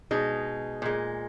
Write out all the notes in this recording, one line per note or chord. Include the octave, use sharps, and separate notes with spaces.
B2 G#3 D#4
A#2 G#3